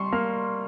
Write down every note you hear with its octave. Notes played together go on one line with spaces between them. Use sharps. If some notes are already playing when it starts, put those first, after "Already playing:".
Already playing: G3 C6 C#6
A#3 F6